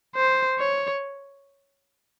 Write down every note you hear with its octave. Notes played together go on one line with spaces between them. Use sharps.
C5
C#5